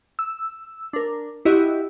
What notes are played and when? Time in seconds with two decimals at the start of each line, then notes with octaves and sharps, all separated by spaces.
0.19 E6
0.93 D4 A#4
1.45 E4 F#4 G4 D#5